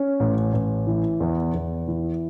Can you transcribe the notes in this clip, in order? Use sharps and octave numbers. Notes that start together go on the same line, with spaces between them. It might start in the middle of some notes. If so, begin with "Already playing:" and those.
Already playing: C#4
A1
A1
E3
E2
E2
E3